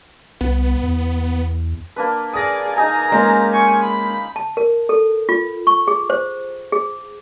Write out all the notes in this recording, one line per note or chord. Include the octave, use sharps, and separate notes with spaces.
C2 B3
E2
A#3 D4 B4
G#4 D5 D#6 A#6
D#4 G#4 G#5 A#5
G#3 A#3 C#4 F4 C5
G#5 C#6
B5
A5
A#4
A4
F4
C#6
G#4
C5
G#4